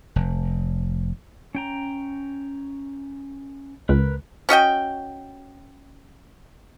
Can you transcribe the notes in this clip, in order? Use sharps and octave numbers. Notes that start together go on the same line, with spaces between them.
F1
C#4 G5 A#5
C#2 A#4 B4
C#4 F#4 D#5 G5